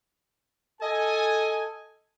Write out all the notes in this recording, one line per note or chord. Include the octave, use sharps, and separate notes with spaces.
A4 D#5 G#5